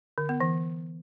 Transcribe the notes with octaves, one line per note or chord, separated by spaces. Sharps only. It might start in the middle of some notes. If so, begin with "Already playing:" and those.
D3
B3
E3